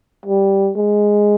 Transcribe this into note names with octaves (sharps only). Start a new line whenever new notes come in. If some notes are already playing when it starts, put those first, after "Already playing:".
G3
G#3